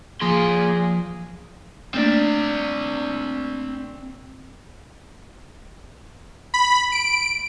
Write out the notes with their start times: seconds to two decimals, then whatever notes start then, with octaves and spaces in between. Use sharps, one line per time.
0.21 F3 A#3 G#4 C6
1.94 A3 A#3 C4 D4 D5
6.54 B5
6.92 D7